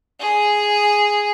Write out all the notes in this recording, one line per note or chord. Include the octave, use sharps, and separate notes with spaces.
G#4